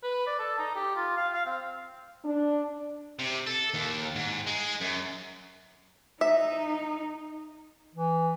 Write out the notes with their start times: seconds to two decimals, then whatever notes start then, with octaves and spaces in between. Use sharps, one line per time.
0.03 B4
0.27 D5
0.39 A4
0.59 D#4
0.75 G4
0.96 F4
1.17 F5
1.34 F5
1.46 C4
2.24 D4
3.19 C3
3.47 A4
3.74 D#2
4.15 G#2
4.47 G#3
4.81 F#2
6.21 D#4 E5
7.95 E3